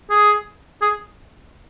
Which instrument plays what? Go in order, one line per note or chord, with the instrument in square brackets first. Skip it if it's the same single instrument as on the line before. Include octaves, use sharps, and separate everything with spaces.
[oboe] G#4
G#4